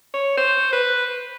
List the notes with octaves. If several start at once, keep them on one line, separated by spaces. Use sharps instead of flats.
C#5
C5
B4